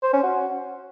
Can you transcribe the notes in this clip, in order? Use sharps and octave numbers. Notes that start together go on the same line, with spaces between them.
C5
C#4
F#4